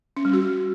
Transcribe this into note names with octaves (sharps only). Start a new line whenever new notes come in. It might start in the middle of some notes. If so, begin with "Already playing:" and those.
C#4
G3
F#4